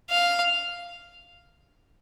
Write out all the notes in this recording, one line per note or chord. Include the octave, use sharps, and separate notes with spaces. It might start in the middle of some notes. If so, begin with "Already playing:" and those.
F5